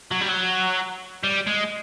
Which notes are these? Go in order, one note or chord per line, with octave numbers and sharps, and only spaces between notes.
F#3
G3
F#3
G3
G#3